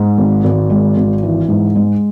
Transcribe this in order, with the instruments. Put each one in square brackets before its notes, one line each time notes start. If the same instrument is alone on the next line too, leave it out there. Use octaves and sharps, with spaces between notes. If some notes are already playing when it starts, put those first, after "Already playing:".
Already playing: [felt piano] G#2
G#1
G#1
G#3
G#1
E3
G#2
G#3